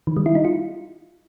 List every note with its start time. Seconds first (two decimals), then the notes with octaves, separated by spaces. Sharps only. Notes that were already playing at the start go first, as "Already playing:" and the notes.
0.07 D#3
0.17 G3
0.26 E4
0.35 D#4
0.45 F4